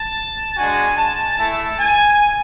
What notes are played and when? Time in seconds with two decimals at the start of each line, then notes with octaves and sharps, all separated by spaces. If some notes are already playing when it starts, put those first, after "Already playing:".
Already playing: A5
0.57 G#3 D4 F#4 G#5
0.98 A5
1.38 A3 E4 A5
1.80 G#5